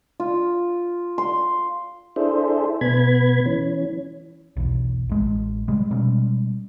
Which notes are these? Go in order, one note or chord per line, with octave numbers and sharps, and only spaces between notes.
F4
C6
D4 E4 G#4 A4 C5
B2 B3 B5 G#6
E3 C#4
B1 E2
A1 G#3
C3 G3 G#3
B2 G3 G#3 C#4